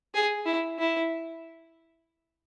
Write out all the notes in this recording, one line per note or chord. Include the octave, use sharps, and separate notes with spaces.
G#4
E4
E4